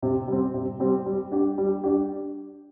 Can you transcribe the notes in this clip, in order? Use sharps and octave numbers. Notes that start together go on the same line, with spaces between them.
C3
G3 C4
C3
G3 C4
G3
D4 G4
G3
D4 G4